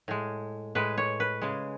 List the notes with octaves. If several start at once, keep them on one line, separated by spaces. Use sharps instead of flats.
A2 G#3
A2 G#3 B4
C#5
B4
C#3 G#3